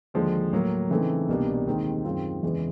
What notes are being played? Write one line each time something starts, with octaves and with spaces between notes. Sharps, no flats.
D#2 D3 F3 G#3
A2 F#3 A#3
C#3 E3 A3 C4 D#4
C2 B2 G3 A#3 D4
D#2 D#3 G#3 C4 D#4
F#2 D#3 G#3 C4 F4
E2 C#3 E3 G#3 B3